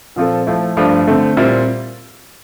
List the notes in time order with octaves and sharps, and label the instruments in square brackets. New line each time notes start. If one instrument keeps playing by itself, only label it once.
[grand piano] A#2 F3 C4 F4 A4
F3 A3 E4
G2 F3 A3 D4
D3 A3 C4
A#2 G3 C4 E4